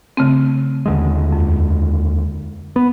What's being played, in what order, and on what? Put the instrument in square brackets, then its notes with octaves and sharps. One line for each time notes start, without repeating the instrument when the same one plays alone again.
[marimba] C#3 A3 C4
[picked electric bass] D#2 D3 G#3
[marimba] F2
[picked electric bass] B3